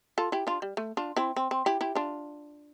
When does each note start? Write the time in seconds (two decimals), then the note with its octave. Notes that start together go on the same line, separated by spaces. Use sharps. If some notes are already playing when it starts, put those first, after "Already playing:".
0.18 F4 A4
0.32 E4 G4
0.47 D4 F4
0.62 G3
0.77 A3
0.97 D4 F4
1.16 C4 E4
1.36 C4
1.51 C4
1.66 E4 G4
1.81 E4 G4
1.95 D4 F4